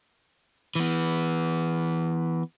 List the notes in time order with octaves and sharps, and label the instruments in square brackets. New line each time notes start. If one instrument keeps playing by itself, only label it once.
[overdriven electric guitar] E3 B3